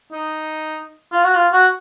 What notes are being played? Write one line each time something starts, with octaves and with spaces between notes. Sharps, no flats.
D#4
F4
F#4
F4
F#4